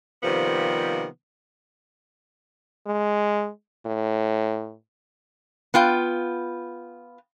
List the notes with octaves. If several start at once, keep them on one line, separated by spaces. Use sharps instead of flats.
C3 D#3 F3 G3 A#3 B3
G#3
A2
B3 F4 G5